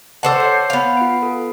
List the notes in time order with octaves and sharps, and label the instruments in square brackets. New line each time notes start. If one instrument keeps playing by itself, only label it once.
[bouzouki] A4 C5 F#5 [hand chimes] A5 C6 D6
[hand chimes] C#5 G6 C7
[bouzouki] B3 F5
[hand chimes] F4 C7 D7
A4